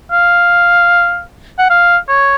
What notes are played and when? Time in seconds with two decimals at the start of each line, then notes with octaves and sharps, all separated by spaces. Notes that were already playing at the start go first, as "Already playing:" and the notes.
0.12 F5
1.59 F#5
1.70 F5
2.09 C#5